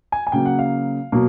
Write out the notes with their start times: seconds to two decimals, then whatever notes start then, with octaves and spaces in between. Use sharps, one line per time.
0.12 G#5
0.27 G#5
0.32 C#3 F#3 A#3 G5
0.46 F#5
0.59 F5
1.12 B2 F#3 A#3